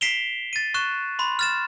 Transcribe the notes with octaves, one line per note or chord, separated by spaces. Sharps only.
B6 C7 D7 E7 F7 G7
A6 D#7
C#6 F#6 E7
B5 C6
F6 A6 E7